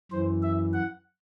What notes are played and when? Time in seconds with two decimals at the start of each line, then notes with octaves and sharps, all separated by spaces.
0.12 F#2 E3 C5
0.43 E5
0.73 F#5